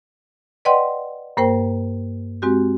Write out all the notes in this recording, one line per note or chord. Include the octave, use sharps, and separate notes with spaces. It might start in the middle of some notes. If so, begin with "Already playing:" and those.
B4 D5 D#5 F#5 G5 C6
G2 A#3 A#4 C5 G5
G#3 C4 F#4 G4